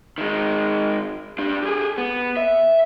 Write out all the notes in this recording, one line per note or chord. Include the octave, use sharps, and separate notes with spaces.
D#3 G#3
G3 D4
G4 G#4
B3
E5